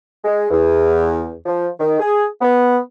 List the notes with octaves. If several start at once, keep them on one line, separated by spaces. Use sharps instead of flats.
G#3
E2
F3
D#3
G#4
B3